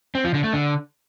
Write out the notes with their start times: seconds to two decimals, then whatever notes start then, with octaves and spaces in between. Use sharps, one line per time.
0.15 C4
0.24 F3
0.34 D3
0.44 A3
0.53 D3